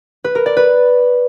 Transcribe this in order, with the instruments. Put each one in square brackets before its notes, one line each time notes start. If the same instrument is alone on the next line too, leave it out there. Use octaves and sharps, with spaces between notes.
[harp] B4
A#4
D5
B4